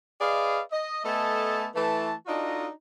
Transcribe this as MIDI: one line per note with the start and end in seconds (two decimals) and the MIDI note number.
0.20 0.60 68
0.20 0.60 71
0.20 0.60 74
0.20 0.60 75
0.20 0.60 77
0.71 1.02 75
1.04 1.66 57
1.04 1.66 59
1.04 1.66 69
1.04 1.66 75
1.04 1.66 80
1.04 1.66 81
1.75 2.12 52
1.75 2.12 57
1.75 2.12 81
2.26 2.67 62
2.26 2.67 63
2.26 2.67 65
2.26 2.67 66
2.26 2.67 69
2.26 2.67 75